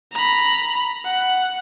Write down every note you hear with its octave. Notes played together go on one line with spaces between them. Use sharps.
A#5 B5
F#5